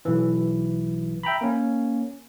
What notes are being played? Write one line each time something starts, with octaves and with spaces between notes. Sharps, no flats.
B1 E3
E5 G5 A#5 B5
A#3 C#4